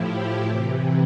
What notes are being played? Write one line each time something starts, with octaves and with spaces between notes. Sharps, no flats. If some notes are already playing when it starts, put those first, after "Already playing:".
Already playing: A2 F3 E4 G4
C3 E3